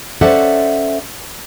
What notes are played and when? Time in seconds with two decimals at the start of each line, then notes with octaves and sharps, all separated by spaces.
0.21 C#4 A4 C5 D5 E5 F#5